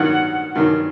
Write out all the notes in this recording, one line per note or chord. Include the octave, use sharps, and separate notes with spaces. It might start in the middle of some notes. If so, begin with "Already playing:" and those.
Already playing: G2 D#3 F#3 F#5
G2 D#3 F#3